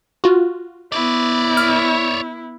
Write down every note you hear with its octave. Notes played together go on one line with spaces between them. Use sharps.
F4 F#4
B3 E4 C#5 D5
F6